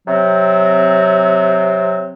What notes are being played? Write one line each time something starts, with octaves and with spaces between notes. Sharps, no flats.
C3 F#3 C4